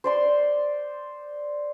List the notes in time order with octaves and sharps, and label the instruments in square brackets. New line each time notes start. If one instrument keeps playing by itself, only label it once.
[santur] C5 D5 C6